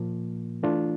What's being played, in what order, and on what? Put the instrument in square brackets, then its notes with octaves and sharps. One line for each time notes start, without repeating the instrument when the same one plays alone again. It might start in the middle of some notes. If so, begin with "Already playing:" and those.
Already playing: [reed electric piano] A#2 F3 A#3
E3 A3 D4 F4